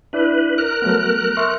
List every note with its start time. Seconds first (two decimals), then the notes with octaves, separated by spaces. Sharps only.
0.13 D4 E4 B4 D5
0.58 A#4 F#6
0.82 F#3 A3 B3
1.37 E5 C6 C#6